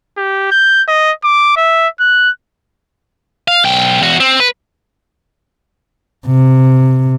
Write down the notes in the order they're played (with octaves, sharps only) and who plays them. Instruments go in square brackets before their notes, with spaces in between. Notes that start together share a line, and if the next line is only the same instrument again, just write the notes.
[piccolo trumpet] G4
G6
D#5
D6
E5
F#6
[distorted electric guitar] F5
B1 G5
E2 F#4
C4
B4
[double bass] C3